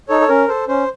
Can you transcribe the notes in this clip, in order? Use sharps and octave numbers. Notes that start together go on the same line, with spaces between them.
D#4 A4 C#5
A4
C#4 A#4
A4 C5
C#4 C5